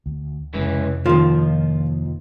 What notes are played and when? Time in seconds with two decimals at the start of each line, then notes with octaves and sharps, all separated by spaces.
0.06 D2
0.54 F1 C#2 E3
1.06 D#2 D#3 F3 F4